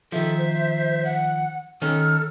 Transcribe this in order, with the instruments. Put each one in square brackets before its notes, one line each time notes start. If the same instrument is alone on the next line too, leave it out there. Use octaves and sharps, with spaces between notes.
[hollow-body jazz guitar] D#3 F3 [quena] A4 [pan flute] E5
[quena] C5
F#5
[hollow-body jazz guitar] D#3 C#4 [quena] A4 [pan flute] F6